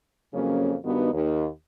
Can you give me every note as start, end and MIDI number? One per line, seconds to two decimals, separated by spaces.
0.33 0.75 41
0.33 0.75 49
0.33 0.75 54
0.33 0.75 58
0.33 0.75 61
0.84 1.12 43
0.84 1.12 51
0.84 1.12 59
0.84 1.12 63
0.84 1.12 66
1.13 1.47 39